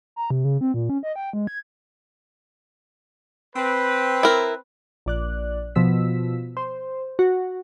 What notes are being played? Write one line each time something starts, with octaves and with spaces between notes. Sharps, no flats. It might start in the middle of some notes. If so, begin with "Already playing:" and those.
A#5
C3
C#3
C4
A#2
C#4
D#5
G5
G#3
G#6
C4 B4
E4 A#4
A#1 D5 F#6
B2 F3 E6 B6
C5
F#4